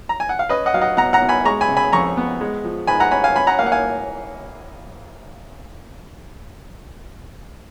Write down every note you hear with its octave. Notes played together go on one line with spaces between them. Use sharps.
A#5
G#5
F#5
F5
C#4 B4 D#5
D#5 F#5
F#3 F5
D#5 F#5
B2 F#5 A#5
F#5 A#5
B2
G#5 B5
G#3 A#5 C#6
G#5 B5
C#3
G#5 B5
F2 A#5 C#6
B3
G#3
F3
G#2 G#5 B5
F#5 A#5
C#4 G#5 B5
F5 G#5
C#4 G#5 B5
F#5 A#5
A#3 F5 G#5
F#5
F5 G#5